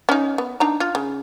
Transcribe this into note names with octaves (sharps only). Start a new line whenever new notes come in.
C#4 D#4
B3
D4 D#4 A#5
F4
C#3